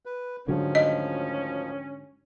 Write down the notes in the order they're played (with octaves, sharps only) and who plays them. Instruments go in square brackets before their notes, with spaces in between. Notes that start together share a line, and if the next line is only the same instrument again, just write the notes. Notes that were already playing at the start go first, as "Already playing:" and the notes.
[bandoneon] B4
[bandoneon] D2 D#3 F3 [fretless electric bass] G#2 D3 F#3 [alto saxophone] C#4
[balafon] D#5